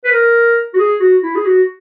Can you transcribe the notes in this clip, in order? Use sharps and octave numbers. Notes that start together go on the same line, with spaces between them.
B4
A#4
F#4
G#4
F#4
E4
G#4
F#4